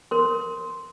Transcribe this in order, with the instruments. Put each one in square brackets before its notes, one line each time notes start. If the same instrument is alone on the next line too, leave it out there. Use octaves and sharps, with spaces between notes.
[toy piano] A#4 C6